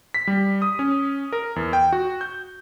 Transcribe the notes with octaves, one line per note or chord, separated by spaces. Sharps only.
B6
G3
D#6
C#4
A#4
E2
G5
F#4
G6